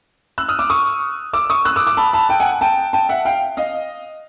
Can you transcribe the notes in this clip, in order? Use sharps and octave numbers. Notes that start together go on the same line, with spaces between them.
E6 F#6
D#6 F6
D6 E6
C#6 D#6
D6 E6
C#6 D#6
E6 F#6
D6 E6
D6 E6
A5 B5
A5 B5
G5 A5
F#5 G#5
G5 A5
G5 A5
E5 F#5
F5 G5
D#5 F5